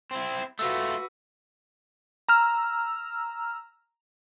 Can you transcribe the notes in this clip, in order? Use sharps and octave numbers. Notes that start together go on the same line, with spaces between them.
C4 E4
A3 F4 F#4 B4 E6
A#5 E6 F6